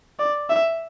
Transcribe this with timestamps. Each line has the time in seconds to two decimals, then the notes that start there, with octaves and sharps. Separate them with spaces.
0.19 D5
0.50 E5